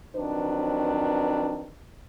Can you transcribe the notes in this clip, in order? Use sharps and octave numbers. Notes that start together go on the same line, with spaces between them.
D#3 F3 F#3 C4 D4 B4